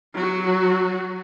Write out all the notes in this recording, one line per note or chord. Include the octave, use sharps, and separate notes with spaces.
F#3 F#4